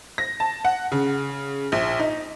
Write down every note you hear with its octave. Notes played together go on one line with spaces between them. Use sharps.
A#6
A5
F#5
C#3
A#1
D#4